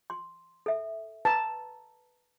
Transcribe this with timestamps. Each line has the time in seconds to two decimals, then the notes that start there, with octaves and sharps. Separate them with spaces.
0.10 C6
0.66 A4 E5
1.25 B4 A5 A#5